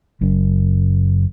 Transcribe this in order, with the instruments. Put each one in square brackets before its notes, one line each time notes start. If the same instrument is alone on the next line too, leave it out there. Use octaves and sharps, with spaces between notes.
[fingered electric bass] F#1 F#2